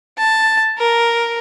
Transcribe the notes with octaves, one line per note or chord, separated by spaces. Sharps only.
A5
A#4